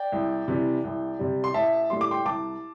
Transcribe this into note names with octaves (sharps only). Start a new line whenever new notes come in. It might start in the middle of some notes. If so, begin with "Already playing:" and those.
Already playing: D5 G5
C2
C3 E3 G3
C2
C3 G3
C6
A1 E5 A5
A2 G3 C6
D6
G5 C6
C2 A5 D6